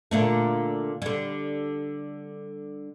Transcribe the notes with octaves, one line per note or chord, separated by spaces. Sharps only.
A#2 D3 A3
D3 G3